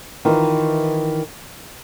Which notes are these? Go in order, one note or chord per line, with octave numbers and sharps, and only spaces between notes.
D#3 E3 F4